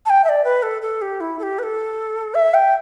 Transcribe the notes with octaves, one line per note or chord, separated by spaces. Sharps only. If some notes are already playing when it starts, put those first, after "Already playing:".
A5
G5
E5
D5
B4
A4
A4
G4
E4
A4
G4
B4
A4
E5
G5